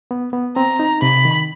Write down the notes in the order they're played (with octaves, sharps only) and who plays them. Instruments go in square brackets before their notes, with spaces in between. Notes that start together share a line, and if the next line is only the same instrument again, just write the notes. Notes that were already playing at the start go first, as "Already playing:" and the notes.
[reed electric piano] B3
B3
[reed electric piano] C4 [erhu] A#5
[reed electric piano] D#4
[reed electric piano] C3 [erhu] B5
[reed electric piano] D#3